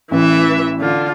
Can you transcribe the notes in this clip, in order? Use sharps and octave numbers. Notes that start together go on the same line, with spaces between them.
A1 E3 E5
D3 F4